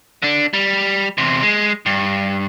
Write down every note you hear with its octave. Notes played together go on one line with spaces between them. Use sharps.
D3 D4
G3
E2 C3
G#3
G2